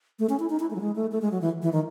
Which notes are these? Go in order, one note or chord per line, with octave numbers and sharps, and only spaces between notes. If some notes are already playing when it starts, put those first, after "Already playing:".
A3
C#4
E4
D#4
E4
A3
F#3
G#3
A3
A3
G#3
F#3
E3
E3
D#3